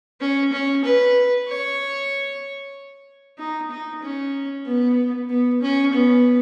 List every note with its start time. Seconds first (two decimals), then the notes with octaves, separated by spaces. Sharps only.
0.20 C#4
0.53 C#4
0.84 B4
1.48 C#5
3.39 D#4
3.71 D#4
4.03 C#4
4.66 B3
5.30 B3
5.62 C#4
5.93 B3